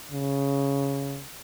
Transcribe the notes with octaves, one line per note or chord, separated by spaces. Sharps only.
C#3